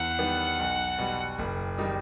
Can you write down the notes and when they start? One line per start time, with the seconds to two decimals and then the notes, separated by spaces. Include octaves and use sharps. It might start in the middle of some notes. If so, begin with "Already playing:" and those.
Already playing: E2 F#5
0.19 D#3 G3 B3
0.59 B1
0.98 B2 G3
1.39 F#1
1.78 D#3 G3 D#4